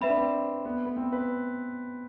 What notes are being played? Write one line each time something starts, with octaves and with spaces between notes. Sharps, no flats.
C4 B4 E5 B5
D4
C4
B3
B3
C4
B4